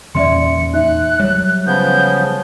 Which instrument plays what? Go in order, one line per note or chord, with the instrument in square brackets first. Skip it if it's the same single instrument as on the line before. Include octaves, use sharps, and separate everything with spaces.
[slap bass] E2 A#2 C#4 [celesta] D5 E5 C6 [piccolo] C#7
[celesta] D#4 E5 [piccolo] F#6
[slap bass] F#3 G3 [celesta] C#5
[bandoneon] C#3 F3 B3 [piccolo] G6